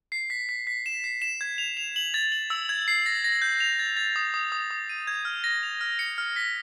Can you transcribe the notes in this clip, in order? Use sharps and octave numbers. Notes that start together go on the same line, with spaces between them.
C7
B6
B6
B6
E7
C7
E7
G#6
F7
F7
F#7
A6
F#7
E6
G#6
C7
A#6
A#6
G6
F7
A6
A6
D#6
D#6
D#6
D#6
D#7
G#6
F6
A#6
F7
F6
C#7
F6
B6